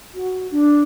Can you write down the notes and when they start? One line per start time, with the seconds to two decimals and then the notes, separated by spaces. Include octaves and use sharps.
0.14 F#4
0.51 D4